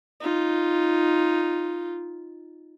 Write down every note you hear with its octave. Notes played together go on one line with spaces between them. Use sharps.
D#4 F4